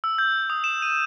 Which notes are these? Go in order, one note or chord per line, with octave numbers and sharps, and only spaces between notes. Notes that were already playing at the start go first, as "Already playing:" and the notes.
E6
G6
D#6
E7
D#7